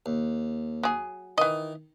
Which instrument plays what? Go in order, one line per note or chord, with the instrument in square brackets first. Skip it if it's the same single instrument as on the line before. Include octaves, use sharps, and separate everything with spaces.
[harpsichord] D#2
[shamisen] F#3 G#4
[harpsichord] D#3 [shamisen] E3 D#5